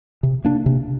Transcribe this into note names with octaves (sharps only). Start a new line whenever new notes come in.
C3
A#3 D4
C3